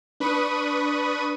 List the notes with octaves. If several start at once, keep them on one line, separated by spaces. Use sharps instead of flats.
D4 B4 B5 C#6 D#6 D#7